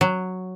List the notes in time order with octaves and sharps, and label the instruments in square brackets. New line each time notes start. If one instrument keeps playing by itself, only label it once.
[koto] F#3